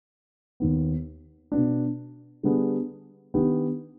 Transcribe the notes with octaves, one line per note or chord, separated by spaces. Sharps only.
D#2 D#3 B3
B2 B3 D4
D3 G3 B3 D4 G#4
D#3 B3 D4 G4